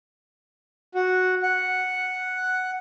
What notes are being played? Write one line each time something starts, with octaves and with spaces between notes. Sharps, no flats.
F#4
F#5